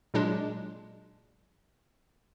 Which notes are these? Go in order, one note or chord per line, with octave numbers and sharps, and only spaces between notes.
A#2 F#3 G#3 D4